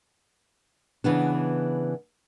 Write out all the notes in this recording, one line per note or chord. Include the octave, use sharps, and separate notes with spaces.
C#3 E3 B3 D4